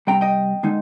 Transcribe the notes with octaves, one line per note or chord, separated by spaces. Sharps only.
C3 G3 C4 G5 A#5
D#5 G5
D3 G#3 D#4